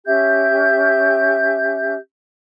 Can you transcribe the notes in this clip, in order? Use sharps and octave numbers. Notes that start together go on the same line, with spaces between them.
C#4 G4 E5 G6